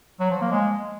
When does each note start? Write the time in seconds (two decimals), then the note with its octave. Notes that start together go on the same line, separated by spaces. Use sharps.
0.20 F#3
0.31 F3
0.41 A#3
0.52 G#3